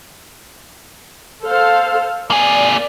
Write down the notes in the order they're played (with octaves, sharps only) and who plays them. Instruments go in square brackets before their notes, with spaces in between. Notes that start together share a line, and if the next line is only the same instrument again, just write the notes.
[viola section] A4 C5 F5
[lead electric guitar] A#3 G#4 [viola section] D5